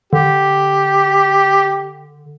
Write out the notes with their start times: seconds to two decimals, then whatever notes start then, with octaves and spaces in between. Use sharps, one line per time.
0.13 D3 G4